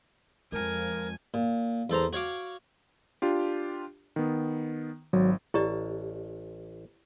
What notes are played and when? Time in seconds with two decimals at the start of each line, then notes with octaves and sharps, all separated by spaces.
0.52 F2 F3 G#3 A#4 G#5
1.34 A#2
1.90 E2 A4 C5 A#5
2.13 F#4 C#5 F5 D6
3.22 D4 F4 G4
4.16 D#3 B3
5.13 G#1 F#3
5.54 A1 E4 G4 D5 A5